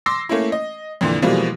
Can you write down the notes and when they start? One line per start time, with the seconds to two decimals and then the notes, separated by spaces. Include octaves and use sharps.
0.06 C6 D6 E6 A#6 C7
0.29 A3 A#3 C#4 E4
0.52 D#5
1.01 F2 A#2 D3 E3
1.22 B2 E3 F3 G3 G#3 A#3